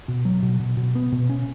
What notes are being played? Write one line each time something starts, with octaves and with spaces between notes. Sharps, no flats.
B2
F#3
B2
B2
B2
B3
B2
C#4